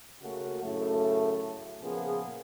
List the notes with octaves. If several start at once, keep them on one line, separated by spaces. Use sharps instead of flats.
C#3 A3 A#3 C#4 F#4
F#2 A2 C#3 A3
A#2 C#3 F3 A#3 B3 G#4